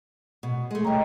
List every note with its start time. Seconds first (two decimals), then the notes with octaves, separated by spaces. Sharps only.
0.43 B2
0.71 G#3 A3
0.84 C#3 G3 D#5 G5 A#5